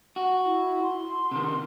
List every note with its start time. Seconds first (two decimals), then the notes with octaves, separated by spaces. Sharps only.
0.16 F#4
0.45 E4
0.82 C6
1.31 C3 D#3